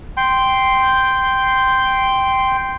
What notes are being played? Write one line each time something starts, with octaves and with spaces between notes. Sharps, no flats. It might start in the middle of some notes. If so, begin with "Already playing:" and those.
G5 C6